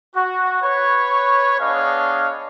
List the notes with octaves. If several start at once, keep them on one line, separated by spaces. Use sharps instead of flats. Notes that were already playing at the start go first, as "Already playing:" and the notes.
F#4
B4 C#5
B3 D4 G#4 C#5 D#5 F5